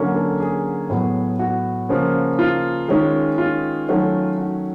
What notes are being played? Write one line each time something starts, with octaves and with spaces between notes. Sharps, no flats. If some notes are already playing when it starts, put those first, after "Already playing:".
Already playing: D3 F#3 A#3 C#4
A4
G#4
A2 F#3 B3
F#4
C#3 F3 A#3 C#4
F4
D#3 G#3 C#4
F4
D#3 F#3 A3 C#4
F#4